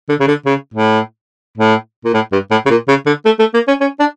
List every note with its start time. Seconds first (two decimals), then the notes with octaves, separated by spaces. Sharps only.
0.09 D3
0.20 C#3
0.28 D3
0.45 C#3
0.74 A2
1.57 A2
2.05 A#2
2.14 A2
2.32 G2
2.51 A2
2.65 C#3
2.70 A#2
2.88 C#3
3.06 D3
3.25 A3
3.39 A3
3.54 A#3
3.67 C#4
3.81 C#4
3.99 D4